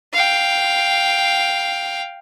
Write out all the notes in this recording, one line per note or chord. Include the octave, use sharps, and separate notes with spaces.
F5 G5